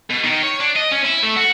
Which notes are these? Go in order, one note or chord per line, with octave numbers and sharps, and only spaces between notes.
B2
D#3
C#5
D4
D#5
C#4
E4
A3
F#4